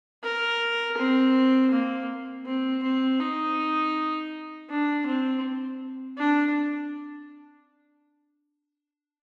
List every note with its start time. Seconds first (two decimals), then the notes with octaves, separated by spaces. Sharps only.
0.24 A#4
0.98 C4
1.72 A#3
2.46 C4
2.83 C4
3.20 D#4
4.70 D4
5.07 C4
6.18 D4